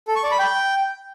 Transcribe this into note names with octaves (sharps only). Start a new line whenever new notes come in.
A4
C#6
D5
B5
G5